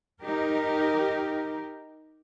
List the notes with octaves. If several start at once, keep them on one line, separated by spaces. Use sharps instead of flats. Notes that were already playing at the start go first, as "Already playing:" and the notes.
D#4 G4 A#4